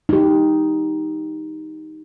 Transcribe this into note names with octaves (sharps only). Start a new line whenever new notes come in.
D#4 G4